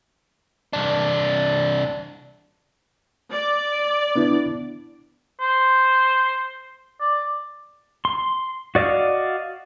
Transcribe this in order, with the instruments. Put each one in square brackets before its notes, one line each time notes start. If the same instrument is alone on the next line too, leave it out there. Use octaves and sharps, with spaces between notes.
[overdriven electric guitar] C2 D4
[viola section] D5
[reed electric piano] B3 D4 E4
[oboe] C5
D5
[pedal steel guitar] C6
F#4 D5 D#5 F5